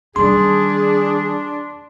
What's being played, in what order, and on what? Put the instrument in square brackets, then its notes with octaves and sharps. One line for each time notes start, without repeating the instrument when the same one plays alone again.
[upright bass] D#3 G3 [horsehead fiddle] D4 [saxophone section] G#4 [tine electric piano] C6